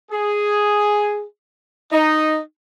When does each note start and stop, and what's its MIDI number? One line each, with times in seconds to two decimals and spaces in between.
0.11 1.23 68
1.92 2.37 63